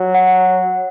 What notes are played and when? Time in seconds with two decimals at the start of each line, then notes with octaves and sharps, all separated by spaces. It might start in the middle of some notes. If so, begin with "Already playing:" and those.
Already playing: F#3
0.15 F#5